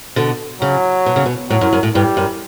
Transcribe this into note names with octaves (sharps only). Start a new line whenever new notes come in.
B2 D3
C#3 F#3
B2
C#3
B2
A2 F#3
F#2
F#2
A2
G2 G3
F#2